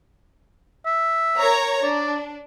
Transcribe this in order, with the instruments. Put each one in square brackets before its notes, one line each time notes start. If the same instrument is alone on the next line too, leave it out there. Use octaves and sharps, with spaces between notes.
[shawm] E5
[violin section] A#4 C#5 A#5
[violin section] D4 [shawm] D5